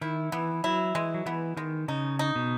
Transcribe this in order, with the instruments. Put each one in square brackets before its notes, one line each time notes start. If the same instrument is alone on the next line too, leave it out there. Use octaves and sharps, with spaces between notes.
[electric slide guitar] D#3 [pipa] E4
[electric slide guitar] E3 [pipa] B3
[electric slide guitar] F#3 [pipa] E4
[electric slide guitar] E3 [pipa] G#3
[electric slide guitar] F#3
[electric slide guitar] E3 [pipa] B3
[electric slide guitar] D#3 [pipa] G#3
[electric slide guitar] C#3 [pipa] D#4
[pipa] D#4
[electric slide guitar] B2